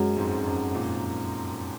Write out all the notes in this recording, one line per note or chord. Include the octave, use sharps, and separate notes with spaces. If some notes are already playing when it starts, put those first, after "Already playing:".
Already playing: F#2 G#3 C#4 F#4
F2 G#2
F#2
A#2